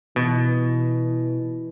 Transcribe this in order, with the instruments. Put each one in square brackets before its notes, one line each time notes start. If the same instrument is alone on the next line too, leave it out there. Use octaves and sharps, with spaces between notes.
[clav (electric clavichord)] B2 [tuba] E3